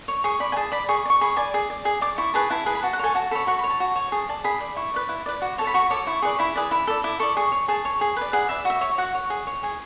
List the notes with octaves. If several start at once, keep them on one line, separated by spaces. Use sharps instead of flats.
C#5
G#4 C#6
D5 B5
G#5
G#4 A5
D5 B5
G#4 C#6
D5
C#6
G#4 B5
D5 G#5
G#4
D5
G#4
D5 D6
E4 C#6
G#4 B4 A5
E4 A5
G#4 B4
B5
F#4 A5
F#5
A4 C#5 G#5
F#4 A5
A4 C#5 B5
F#4 C#6
B5
C#5
A5
F#4
C#5
G#4 A5
D5 A5
G#4 B5
D5
E4 C#6
B4 D5
E4
B4 D5
F#4
A4 C#5 A5
B5
F#4 C#6
A4 C#5 D6
E4 C#6
G#4 B4 D5 C#6
E4 B5
G#4 B4 D5
E4 B5
A4 D5
E4 D6
A4 D5 C#6
G#4 C#6
C#5
G#4 A5
C#5
G#4
B4 D5
G#4 F#5
B4 D5 E5
F#4 E5
C#5
F#4 F#5
C#5
G#4
C#5
G#4 G#5